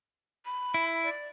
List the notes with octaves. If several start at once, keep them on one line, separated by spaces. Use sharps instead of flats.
B5
E4
D5